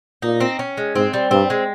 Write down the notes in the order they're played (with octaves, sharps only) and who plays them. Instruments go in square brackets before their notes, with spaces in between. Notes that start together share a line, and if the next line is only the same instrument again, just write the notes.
[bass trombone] A#2 [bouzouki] D#4
[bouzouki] C4
C#4
G#3
[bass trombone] G#2 [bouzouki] C4
[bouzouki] G3
[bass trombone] G2 [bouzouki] C4
[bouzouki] G#3